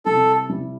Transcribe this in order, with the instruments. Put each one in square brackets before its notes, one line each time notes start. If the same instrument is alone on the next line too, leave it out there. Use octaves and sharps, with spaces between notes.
[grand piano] C3 G3 E4 [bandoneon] A4
[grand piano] C3 G3 E4